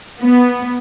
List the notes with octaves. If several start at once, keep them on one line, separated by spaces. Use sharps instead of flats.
B3